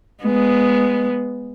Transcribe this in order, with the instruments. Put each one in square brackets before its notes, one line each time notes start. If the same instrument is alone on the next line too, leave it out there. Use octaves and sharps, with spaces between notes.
[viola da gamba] G#3 B3